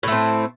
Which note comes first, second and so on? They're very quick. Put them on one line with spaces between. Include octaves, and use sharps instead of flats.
A2 A3 C4